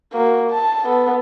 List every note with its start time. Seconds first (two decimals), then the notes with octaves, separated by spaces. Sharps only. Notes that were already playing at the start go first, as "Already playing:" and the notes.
0.13 A#3 F#4
0.51 A5
0.85 B3 A4